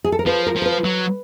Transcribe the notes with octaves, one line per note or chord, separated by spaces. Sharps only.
G#4
A4
A#4
F3 B4
A#4
F3
A#4
B4
F#3